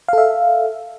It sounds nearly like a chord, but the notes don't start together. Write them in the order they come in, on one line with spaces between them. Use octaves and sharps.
F5 A4 E5